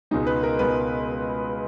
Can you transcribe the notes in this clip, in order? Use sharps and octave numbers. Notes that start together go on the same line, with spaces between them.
C#2 B2 G#3 D#4
B4
A#4
C#2 B2 G#3 B4